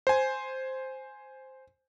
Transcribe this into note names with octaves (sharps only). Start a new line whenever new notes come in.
C5 G#5